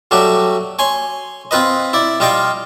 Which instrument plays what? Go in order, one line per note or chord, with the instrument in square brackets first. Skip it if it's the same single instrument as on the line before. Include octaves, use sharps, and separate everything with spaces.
[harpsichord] F#3 G3 A3 F#4 G4
C#5 G#5 C6
C4 F4 B4 D#5
E4 D5
G3 F4 D#5 F5 G5